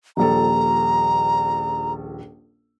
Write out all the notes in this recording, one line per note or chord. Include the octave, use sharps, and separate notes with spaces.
D#1 A#1 A4 A#5